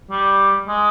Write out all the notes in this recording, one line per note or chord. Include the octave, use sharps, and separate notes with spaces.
G3
G#3